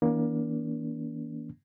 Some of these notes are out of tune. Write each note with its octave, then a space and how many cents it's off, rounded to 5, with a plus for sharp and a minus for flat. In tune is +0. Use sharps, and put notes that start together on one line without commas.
E3 -40 A#3 +25 D4 -40